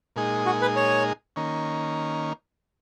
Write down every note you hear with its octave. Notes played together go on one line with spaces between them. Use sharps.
A#2 G#3 D#4 G#4
F#4
B4
C#5
D#3 A#3 C#4